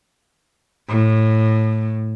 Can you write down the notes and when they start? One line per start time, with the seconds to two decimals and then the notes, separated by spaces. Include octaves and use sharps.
0.89 A2